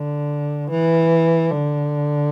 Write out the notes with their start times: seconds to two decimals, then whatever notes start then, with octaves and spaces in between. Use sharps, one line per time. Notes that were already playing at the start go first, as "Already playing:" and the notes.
Already playing: D3
0.70 E3
1.50 D3